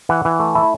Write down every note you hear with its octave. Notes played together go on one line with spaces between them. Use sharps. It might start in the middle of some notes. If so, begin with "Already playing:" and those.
E3 F#5
E3
A3
E4 A5